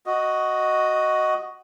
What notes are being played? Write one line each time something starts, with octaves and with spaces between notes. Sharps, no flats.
F#4 D#5